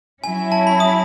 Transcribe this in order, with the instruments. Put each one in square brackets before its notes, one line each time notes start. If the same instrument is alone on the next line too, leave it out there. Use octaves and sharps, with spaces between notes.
[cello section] F#3 C#4 E4 [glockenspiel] G#5
[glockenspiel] A5
B5
D#6